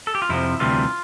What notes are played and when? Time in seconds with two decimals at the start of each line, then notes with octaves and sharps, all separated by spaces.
0.07 A4
0.15 G4
0.22 F4
0.29 F2 C3 F3 E4
0.60 D2 C3 E3 G3 F4